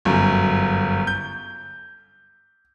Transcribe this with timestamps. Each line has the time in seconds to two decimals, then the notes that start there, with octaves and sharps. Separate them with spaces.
0.05 G1 F#2
1.07 G6